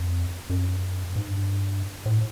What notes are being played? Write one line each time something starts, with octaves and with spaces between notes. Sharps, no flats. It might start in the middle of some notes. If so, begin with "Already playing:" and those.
Already playing: F2
F#2
G#2
G2
A2